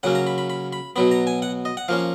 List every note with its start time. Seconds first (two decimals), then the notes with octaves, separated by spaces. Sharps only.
0.03 C#3 F#3 A#3 C#4 F#5
0.15 A#5
0.27 B5
0.38 B5
0.50 B5
0.73 B5
0.96 B2 F#3 B3 B5
1.11 A#5
1.27 G#5
1.42 F#5
1.65 D#5
1.77 F#5
1.88 F3 A#3 C#4 F5